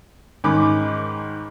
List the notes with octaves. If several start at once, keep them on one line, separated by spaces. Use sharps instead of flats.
G#2 D#3 C#4 B5 D6